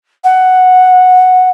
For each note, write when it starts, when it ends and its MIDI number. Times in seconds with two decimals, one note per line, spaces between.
0.24 1.49 78